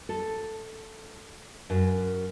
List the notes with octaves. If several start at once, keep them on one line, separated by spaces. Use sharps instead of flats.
A4
F#2